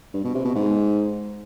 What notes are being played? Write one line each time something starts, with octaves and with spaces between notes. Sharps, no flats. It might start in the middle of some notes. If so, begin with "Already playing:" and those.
G2
B2
C3
B2
G#2